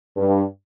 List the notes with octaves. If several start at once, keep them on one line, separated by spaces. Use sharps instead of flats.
G2